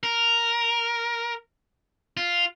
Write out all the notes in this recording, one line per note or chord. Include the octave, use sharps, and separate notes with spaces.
A#4
F4